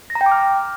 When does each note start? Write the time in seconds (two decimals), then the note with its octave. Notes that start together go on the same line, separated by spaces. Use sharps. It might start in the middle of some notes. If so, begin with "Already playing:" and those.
0.10 A#6
0.15 A#5
0.21 G5
0.26 D6
0.32 F6